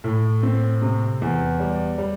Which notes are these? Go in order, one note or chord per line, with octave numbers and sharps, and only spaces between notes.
A2
C4
C3
E2
G3
G3